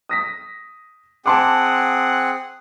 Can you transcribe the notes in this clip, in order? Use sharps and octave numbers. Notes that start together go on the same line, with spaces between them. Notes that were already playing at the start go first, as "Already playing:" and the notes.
D#6 A#6 B6
C4 G#4 F#5 A5 C6 D6